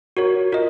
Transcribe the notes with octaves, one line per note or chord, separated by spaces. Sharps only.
F#4 A#4 C#5
F4 A#4 D#5